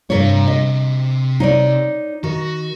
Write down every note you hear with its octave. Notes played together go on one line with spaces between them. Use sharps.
G2 C3 A#4 C#5 A#5
D#5
D#4 C#5 D5
D#3 F#4